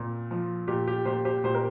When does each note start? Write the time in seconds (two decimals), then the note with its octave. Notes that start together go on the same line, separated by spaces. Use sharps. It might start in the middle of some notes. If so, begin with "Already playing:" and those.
Already playing: A#2 C4
0.31 F3
0.68 A#2 G4
0.88 G4
1.05 A#2 G4 C5
1.25 G4 C5
1.44 A#2 G4 C5
1.55 A#4